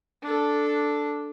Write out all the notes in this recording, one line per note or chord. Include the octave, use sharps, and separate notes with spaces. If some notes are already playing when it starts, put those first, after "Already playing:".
D4 A4